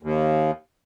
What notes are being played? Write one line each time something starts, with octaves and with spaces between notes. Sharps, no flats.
D#2